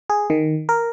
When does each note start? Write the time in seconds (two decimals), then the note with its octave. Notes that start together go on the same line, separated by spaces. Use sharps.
0.10 G#4
0.30 D#3
0.69 A#4